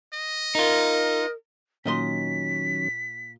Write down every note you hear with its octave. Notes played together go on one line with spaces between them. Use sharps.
D#5
D#4 F4 A#4
A#2 D#3 F#3 C#4 D#5 C6 B6